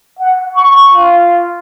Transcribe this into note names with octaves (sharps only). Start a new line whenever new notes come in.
F#5
C#6
F4